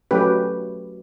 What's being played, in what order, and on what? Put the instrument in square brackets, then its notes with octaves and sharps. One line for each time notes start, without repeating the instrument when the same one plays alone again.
[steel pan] F#3 A3 C#4 G4 B4